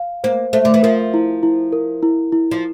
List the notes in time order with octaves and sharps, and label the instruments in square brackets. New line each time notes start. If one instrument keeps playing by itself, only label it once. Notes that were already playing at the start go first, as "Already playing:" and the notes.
Already playing: [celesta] F5
[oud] A#3 [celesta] C5
[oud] A3 [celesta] C5
[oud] D3
E3
[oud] F3 [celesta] A#4
[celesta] E4
E4
A#4
E4
E4
[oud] F3